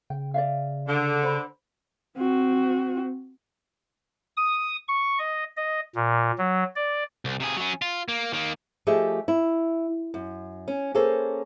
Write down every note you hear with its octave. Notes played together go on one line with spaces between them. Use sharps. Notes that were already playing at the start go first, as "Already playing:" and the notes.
C#3 G5
D5 E5 F5
D3
C5 B5
C4 F#4
D#6
C#6
D#5
D#5
A#2
F#3
D5
C2
C3 G#4
F#3 C#4
F4
A#3
D#3 A#3
F3 A3 G4 G#4 D#5 E5
E4
F#2
C#4
A#3 C#4 G#4 A4 C5 C#5